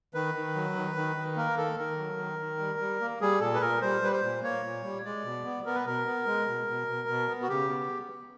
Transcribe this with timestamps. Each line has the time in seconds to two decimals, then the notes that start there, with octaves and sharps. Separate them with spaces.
0.14 D#3 B4
0.35 D#3
0.55 F#3
0.76 D#3
0.96 D#3
1.16 D#3
1.36 A#3 A#4
1.57 D#3 A4
1.78 D#3 A#4
1.98 F#3
2.19 D#3
2.39 D#3
2.59 G3
2.79 G3
3.00 A#3
3.21 G3 G#4
3.41 A#2 A4
3.54 B4
3.61 A#2 A#4
3.81 G3 C5
4.02 G3 B4
4.12 C5
4.22 A#2
4.43 A#3 C#5
4.64 A#2
4.83 G3
5.04 G#3 D5
5.24 B2
5.44 B3
5.65 B3 A#4
5.75 B4
5.86 B2 A#4
6.06 B3
6.26 G#3
6.47 B2
6.67 B2
6.87 B2
7.08 B2
7.28 B3
7.42 F#4
7.49 C#3 G4
7.69 B3